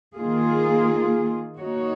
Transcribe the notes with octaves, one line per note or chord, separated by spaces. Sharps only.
D#3 A#3 F4 G#4
A#3 D#4 F#4 C#5